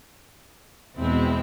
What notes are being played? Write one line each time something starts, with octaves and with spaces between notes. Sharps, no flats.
E2 B2 G#3 C4 E4